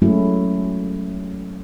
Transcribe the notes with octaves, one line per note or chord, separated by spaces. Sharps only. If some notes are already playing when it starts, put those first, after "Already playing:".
F#3 G#3 A3 C#4 E4 F#4